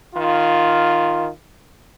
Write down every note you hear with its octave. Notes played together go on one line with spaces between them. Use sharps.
D#3 F4